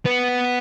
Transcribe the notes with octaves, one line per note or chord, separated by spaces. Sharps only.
B3